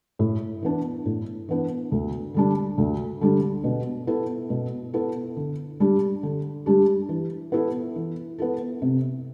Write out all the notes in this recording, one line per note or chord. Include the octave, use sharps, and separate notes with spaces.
A2
E3 B3 D4
A2
E3 B3 D4
D2
D3 G3 D4
D2
D3 G3 D4
B2
B3 E4 A4
B2
B3 E4 A4
D3
G3 D4 G4
D3
G3 D4 G4
E3
B3 E4 A4
E3
B3 E4 A4
C3